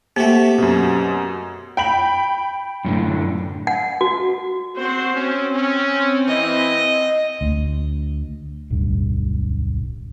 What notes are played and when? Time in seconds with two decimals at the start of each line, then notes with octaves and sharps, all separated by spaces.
0.16 C3 A3 A#3 F#4
0.58 F#2 B2
1.77 G5 B5 F#7
2.85 F#2 A2 D3
3.67 F#5
4.01 F#4
4.76 C4 F#4 C5
5.15 C4 C#4
5.55 C#4
6.28 E3 D#5
7.41 D2
8.70 D1 B1 G2